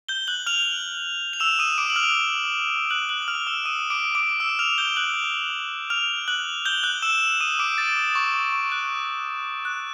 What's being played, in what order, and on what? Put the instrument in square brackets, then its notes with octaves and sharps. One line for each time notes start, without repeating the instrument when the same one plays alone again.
[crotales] G6 G7
F#6 F#7
F6 F7
F7
E6 E7
D#6 D#7
D6 D7
F#7
F6 F7
F#6 F#7
F#6 F#7
F#7
F6 F7
E6 E7
D#6 D#7
D6 D7
D6 D7
E6 E7
F6 F7
G6 G7
F#6 F#7
F6 F7
F#6 F#7
G6 G7
F#6 F#7
E6 E7
D#6 D#7
D6 D7
A6
D#6
C#6
C#6
C#6
F#6
F#6